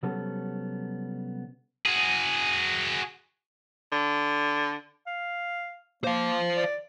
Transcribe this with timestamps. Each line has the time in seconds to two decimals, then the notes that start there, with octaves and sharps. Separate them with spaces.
0.03 C3 F#3 G3 B3 C#4 A4
1.86 F#4 G#4
3.92 D3
5.07 F5
6.04 A#3 C5 F5
6.57 D5